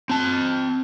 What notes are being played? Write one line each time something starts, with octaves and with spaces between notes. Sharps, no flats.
C4 A5